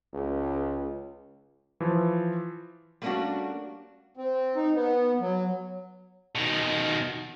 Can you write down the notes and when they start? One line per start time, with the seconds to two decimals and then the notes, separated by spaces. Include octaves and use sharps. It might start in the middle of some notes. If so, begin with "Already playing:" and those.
0.13 C#2
1.80 E3 F3
3.02 G3 A3 A#3 C#4 D4 F#4
4.17 C4
4.56 D#4
4.75 B3
5.21 F#3
6.35 B2 D#3